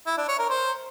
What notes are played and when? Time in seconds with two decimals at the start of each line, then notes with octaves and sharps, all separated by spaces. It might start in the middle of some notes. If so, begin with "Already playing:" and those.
0.07 E4
0.17 D4
0.28 C#5
0.39 A#4
0.50 C5